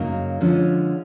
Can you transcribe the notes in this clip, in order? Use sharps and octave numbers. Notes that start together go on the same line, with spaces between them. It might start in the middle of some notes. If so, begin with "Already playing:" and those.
Already playing: F#2 C#3 F#3 A#3 D#4
D3 F3 G#3 C#4